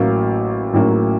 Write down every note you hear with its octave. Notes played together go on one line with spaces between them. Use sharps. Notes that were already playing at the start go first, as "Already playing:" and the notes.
Already playing: A1 A2 F#3 A#3 C#4 F5
A1 A2 F#3 A#3 C#4